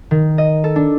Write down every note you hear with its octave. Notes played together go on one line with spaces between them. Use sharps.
D#3
D#5
A4
D4